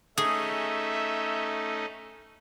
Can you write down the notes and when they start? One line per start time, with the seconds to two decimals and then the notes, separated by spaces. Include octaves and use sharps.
0.18 A3 C#4 D#4 G#4 E5